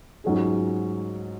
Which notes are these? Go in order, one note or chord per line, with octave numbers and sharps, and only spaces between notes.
G#2 F#3 C#4 F4 G#4